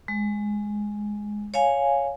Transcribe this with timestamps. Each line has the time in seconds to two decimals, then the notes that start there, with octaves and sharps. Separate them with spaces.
0.08 G#3
1.54 C#5 F5 G#5